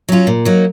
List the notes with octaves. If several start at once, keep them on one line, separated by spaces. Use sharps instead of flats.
F#3 C#4 F4
A#2
F#3 A#3 D#4